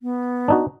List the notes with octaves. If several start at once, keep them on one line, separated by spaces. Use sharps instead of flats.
B3
D4 D#4 F#4